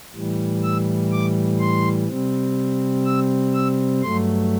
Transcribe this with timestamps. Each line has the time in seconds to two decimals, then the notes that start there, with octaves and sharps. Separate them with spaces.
0.14 A2 E3 G3
0.63 E6
1.12 D6
1.60 C6
2.08 C3 G3 C4
3.05 E6
3.54 E6
4.02 G2 F#3 A3 C6